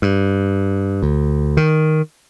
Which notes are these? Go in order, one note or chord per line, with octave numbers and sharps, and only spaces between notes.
G2
D2
D#3